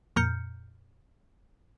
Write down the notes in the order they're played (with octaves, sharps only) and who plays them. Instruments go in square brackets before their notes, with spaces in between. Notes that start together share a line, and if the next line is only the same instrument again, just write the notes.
[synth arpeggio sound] F2 A#2 A#5 F6 G6 C#7